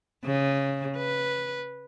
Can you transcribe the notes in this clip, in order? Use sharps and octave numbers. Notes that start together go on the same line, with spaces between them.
C#3
B4